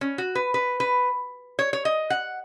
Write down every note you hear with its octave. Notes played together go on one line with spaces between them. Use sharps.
C#4
F#4
B4
B4
B4
C#5
C#5
D#5
F#5